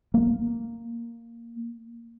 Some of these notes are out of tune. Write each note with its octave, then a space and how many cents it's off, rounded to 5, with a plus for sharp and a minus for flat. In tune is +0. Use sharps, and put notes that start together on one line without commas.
A#3 -5